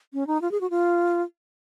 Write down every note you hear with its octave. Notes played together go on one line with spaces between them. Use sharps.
C#4
D#4
F4
G#4
F#4
F4